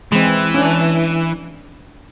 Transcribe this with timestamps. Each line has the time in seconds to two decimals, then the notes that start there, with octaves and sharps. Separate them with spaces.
0.12 E3 G#3 C4
0.54 C#4 D4